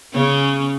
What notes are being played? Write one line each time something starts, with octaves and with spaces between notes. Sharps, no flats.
C#3 C#4